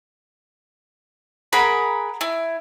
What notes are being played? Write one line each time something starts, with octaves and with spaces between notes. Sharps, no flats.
G#4 A#4 F#5 B5
E4